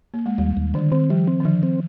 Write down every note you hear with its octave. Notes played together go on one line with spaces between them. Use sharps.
A#3
G#3
D#2 G3
D#2
D3 D#3
D#3 C4
F3 G3
C4
D#3
D3 F3
C4